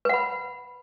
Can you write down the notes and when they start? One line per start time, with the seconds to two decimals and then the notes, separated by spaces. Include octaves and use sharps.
0.05 B4
0.09 F#5
0.14 B5